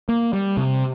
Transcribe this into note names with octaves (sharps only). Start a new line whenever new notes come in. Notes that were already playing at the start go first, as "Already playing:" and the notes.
A#3
G3
C3